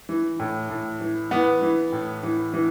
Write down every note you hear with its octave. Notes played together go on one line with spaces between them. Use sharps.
E3
A2
A2
E3
E3 B3
E3
A2
E3
E3